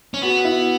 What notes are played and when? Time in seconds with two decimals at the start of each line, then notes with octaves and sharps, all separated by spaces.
0.14 C#4
0.22 B3 F#4
0.45 E4